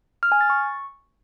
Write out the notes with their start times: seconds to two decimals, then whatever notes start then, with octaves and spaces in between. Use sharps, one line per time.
0.23 F6
0.32 G#5
0.41 A6
0.50 C#6